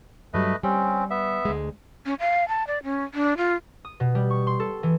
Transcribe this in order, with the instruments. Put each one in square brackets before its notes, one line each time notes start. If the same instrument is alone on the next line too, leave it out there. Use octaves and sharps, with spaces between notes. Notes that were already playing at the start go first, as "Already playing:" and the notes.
[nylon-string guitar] G2 F#3 G3 [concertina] A3 B4 D#5
[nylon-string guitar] G3 [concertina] C4 C#4
[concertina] B3 E5
[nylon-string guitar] D2 G#3
[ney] C#4
F5
A5
D5
C#4
D4
F4
[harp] D#6
B2
G3
C#6
C6
A4
E3